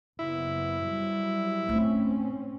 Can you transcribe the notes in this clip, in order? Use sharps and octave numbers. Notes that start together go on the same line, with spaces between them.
F#1 B3 E4
F#3 G3
G#2 A3 C4 C#4 D#4